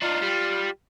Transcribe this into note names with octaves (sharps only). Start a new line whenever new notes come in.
D4 D#4 F4
G3